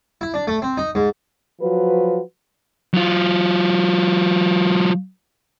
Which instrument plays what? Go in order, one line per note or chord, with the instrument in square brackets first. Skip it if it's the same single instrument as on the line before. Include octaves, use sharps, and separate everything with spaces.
[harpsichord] E4
D4
A3
C4
D#4
G#2
[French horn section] F3 F#3 F#4 B4
[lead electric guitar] F#3 F4